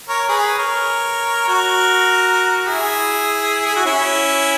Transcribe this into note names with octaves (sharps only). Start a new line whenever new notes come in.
A#4 C#5
G#4 B4
A#4 C#5
F#4 A#4
E4 G#4
G#4
F#4
C#4 E4